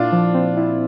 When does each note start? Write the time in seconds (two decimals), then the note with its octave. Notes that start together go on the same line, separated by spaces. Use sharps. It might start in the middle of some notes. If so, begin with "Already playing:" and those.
Already playing: A#2 D4 E4 F4
0.12 F3
0.34 C4
0.57 E4